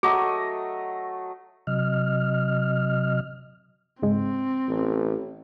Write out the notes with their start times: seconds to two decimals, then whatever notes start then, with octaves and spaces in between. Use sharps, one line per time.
0.03 F#3 A3 G#4 D#5
1.67 C3 F#3 D#5 F6
4.03 G#2 C#3 G#3 C4
4.68 A1